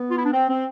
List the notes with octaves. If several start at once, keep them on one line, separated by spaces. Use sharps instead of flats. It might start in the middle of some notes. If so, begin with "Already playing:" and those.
Already playing: B3
F4
E4
D4
C4
C4